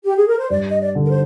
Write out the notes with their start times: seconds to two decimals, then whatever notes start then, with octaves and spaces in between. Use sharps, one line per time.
0.04 G4
0.16 G#4
0.27 A#4
0.39 C5
0.50 G2 D5
0.69 D#5
0.80 D5
0.95 D3
1.05 A#4
1.10 C5